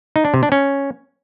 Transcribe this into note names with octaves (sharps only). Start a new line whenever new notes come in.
D#4
D4
C3
D4
C#4